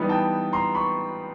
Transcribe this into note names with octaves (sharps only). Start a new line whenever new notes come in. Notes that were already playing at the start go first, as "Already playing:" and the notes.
Already playing: E3 G3 B3 D#4
G5 A5
A#5 C6
B5 C#6